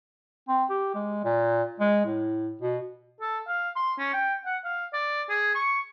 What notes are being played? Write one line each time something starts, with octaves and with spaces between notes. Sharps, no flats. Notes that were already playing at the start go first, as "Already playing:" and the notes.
C4
G4
G#3
A#2
G#3
A2
B2
A4
F5
C6
C#4
G5
F#5
F5
D5
G#4
C#6